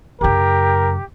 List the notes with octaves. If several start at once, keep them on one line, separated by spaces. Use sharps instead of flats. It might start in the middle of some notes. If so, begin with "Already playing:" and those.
F#2 C#3 G4 A#4